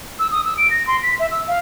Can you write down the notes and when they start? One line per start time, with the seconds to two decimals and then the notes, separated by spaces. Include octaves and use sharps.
0.19 E6
0.31 D#6
0.45 E6
0.57 D7
0.70 A#6
0.87 C6
1.03 B6
1.19 E5
1.31 E6
1.47 F5